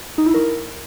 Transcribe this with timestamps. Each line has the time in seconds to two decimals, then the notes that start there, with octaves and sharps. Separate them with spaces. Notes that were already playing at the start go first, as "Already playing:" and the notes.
0.18 D#4
0.26 E4
0.34 A#4